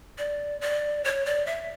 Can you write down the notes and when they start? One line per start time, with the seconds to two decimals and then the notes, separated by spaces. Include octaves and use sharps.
0.18 D5
0.61 D5
1.04 C#5
1.26 D5
1.46 E5